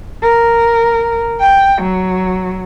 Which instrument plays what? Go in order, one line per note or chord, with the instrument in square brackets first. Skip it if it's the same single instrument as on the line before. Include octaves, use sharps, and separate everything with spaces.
[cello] A#4
G5
F#3